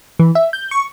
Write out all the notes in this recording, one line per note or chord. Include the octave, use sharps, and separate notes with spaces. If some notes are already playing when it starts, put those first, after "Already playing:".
E3
E5
G6
C#6